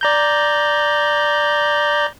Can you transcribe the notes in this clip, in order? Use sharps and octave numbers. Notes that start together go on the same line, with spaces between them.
D5 A#5 G6